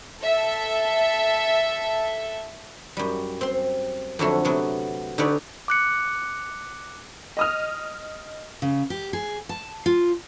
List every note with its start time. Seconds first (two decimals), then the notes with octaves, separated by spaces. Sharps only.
0.22 A4 E5
2.97 F#2 G3
3.41 C4 C6
4.19 F2 D3 F#3 A3
4.45 C3 F#3 B3
5.18 D3 D#4 G4 B4 C#5 D5
5.68 D6 F#6 C#7
7.37 D#5 D#6 F6
8.62 C#3
8.90 G4
9.13 G#4
9.49 A5
9.86 F4